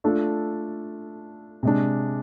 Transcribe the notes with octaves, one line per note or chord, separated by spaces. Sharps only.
A3 D4 F4 A4
C3 G#3 D4